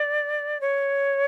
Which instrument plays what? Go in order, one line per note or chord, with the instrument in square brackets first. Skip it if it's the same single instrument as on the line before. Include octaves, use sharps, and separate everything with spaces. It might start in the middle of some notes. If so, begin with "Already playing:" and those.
Already playing: [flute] D5
C#5